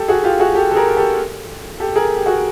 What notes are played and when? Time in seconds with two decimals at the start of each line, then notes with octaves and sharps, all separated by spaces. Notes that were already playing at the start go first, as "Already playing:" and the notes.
Already playing: G4 A4
0.08 F#4 G#4
0.24 F4 G4
0.40 F#4 G#4
0.55 G4 A4
0.71 A4
0.75 G#4 A#4
0.88 A#4
0.97 G4 A4
1.80 G4 A4
1.96 G#4 A#4
2.16 G4
2.26 F#4 G#4